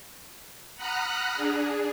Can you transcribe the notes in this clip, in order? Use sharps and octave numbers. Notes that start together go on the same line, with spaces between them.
F#5 A#5 B5 D#6 F6 F#6
D4 G#4